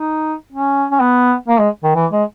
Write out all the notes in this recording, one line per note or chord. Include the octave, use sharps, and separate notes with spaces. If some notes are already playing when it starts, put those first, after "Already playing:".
Already playing: D#4
C#4
C#4
B3
A#3
G#3
D#3
E3
G#3